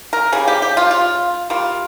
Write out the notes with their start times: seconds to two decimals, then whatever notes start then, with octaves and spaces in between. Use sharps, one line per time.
0.13 A#4
0.32 C#3 G3 A#3 G#4
0.48 G4
0.62 G4
0.77 F4
0.91 F4
1.50 G3 A#3 F4